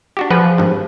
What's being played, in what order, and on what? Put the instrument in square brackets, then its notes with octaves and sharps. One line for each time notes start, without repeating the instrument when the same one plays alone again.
[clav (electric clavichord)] D4 F#4 G4
[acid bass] F3 [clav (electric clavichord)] G#4 B4 F#5
[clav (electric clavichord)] G#1 G2